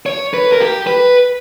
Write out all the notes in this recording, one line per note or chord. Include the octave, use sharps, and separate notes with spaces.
C#5
B4
A#4
G4
B4